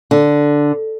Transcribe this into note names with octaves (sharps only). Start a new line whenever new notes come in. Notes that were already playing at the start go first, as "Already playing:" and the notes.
D3